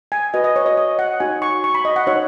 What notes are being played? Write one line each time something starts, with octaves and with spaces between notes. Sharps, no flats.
G#5
F#4 B4 D#5
D#5
C#5
D#5
D#5
F#5
D#4 F#4 C#5 G#5
C#6
C#6
B5
D#5
F#5
D#4 F#4 C#5